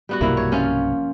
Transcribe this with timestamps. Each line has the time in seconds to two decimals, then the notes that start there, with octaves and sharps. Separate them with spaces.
0.09 G3 B3 F#4
0.21 B1 G2 C3 A#3 E4
0.37 C#5
0.52 F3 C#4 F4